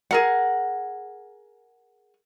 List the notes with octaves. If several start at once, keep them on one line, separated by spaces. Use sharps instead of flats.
G#4 A#4 F#5